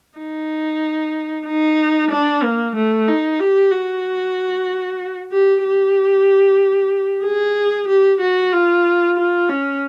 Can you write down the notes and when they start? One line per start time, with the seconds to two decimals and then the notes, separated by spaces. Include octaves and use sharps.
0.19 D#4
1.47 D#4
2.11 D4
2.43 A#3
2.76 A3
3.08 D#4
3.39 G4
3.71 F#4
5.31 G4
5.64 G4
7.24 G#4
7.88 G4
8.21 F#4
8.53 F4
9.17 F4
9.49 C#4